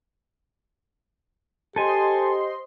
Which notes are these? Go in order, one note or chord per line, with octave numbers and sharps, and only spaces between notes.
G4 A4 C5 D#5 G#5 C6